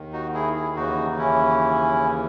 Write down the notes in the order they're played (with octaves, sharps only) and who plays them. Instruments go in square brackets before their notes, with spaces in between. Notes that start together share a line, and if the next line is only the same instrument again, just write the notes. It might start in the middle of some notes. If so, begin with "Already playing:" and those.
Already playing: [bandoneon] D#2 D#3
D#4 F#4
E4 G#4
E4 G#4
D#2 C#3 E3 D#4 F#4
D#4
C#4 E4